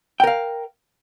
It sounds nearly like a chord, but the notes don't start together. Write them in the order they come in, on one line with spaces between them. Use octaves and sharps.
G5 A#4 F5